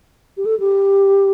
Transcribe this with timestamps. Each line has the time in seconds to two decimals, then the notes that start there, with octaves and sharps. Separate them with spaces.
0.37 G4
0.45 A4
0.60 G4